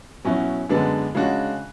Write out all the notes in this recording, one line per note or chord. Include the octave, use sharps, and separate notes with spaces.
B2 F#3 C#4 E4
F#2 D3 G#3 B3 D4
C#3 G#3 D4 F#4